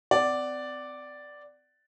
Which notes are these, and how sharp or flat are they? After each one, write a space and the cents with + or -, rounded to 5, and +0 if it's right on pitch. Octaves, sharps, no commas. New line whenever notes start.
C4 -35 D5 +0 F#5 +15